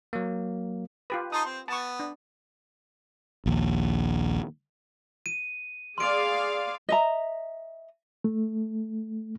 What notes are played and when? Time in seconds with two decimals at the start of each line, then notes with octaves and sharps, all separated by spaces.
0.13 F#3 A#3
1.10 F4 G4 B4
1.32 D#4 A5 C6 D#6
1.45 C4
1.68 B3 A5 C#6
2.00 D4
3.46 A#1 D#2
5.26 D#7
5.98 G#4 D5 F5 C6 D7
6.89 D#5 E5 A#5
8.24 A3